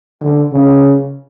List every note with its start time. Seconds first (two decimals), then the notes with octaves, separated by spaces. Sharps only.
0.21 D3
0.52 C#3